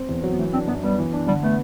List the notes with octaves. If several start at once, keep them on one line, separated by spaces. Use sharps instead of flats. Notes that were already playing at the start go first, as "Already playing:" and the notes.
Already playing: C4
E2
F#3
B3
E3 A3
C4 D4
F#2 B3
G3 B3
E3
D4
D3 G3
A3 B3